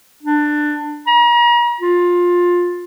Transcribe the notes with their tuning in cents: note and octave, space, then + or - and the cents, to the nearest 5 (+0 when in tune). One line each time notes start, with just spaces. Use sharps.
D4 +20
A#5 +40
F4 +15